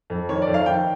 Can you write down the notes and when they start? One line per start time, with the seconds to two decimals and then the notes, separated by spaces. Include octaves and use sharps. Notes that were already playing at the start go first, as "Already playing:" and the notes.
0.10 F2
0.29 D#3 C#5
0.42 D5
0.47 F2
0.54 F5
0.66 D#3 G5